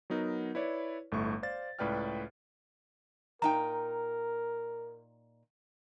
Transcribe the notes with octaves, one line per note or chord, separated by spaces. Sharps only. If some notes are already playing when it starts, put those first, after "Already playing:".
F#3 B3 D#4 A#4
E4 B4 C#5 D5
G1 A2 A3 C#6
C5 D5 F5 A6
C#2 A2 B4 D5 G5 F6
A#2 D#4 A#4 G5 A#5